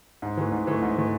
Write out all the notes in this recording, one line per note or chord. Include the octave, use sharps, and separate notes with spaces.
G#2
E3 A3
G#2
E3 A3
G#2
E3 A3